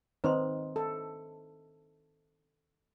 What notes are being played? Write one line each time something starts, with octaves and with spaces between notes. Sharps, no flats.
D#3 C4 D#4 B4 C5 C6
A4